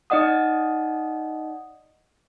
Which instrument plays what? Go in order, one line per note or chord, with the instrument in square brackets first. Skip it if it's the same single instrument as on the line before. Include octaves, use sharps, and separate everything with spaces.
[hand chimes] D#4 D5 D#5 F#5 D#6